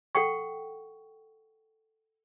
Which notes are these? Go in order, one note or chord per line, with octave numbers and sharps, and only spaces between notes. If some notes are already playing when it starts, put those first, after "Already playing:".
A4 F#5 G5 C#6